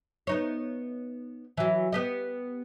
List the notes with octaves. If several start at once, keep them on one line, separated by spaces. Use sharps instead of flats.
B3 D#4 C#5
E3 F#3
B3 G4 D#5